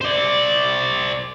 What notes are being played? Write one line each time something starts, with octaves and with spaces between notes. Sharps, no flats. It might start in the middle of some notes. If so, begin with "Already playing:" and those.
C5 D5